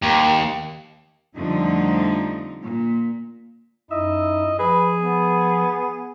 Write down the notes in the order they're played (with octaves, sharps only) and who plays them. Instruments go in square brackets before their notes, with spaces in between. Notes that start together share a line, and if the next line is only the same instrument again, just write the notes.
[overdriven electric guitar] D#2
[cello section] F2 D3 F3 G3 A3 D#4
A#2
[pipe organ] F#2 D#4 E4 [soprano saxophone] D#5 [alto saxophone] E5
[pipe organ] F3 [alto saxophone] G#4 [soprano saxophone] B4
[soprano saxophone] B3